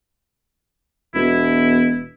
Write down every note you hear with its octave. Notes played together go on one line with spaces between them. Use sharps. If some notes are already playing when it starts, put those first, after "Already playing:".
E1 B2 E4